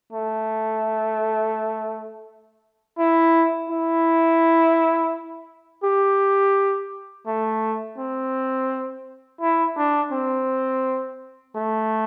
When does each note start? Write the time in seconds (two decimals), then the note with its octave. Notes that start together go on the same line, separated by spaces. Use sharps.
0.13 A3
2.98 E4
3.69 E4
5.84 G4
7.27 A3
7.98 C4
9.41 E4
9.77 D4
10.12 C4
11.56 A3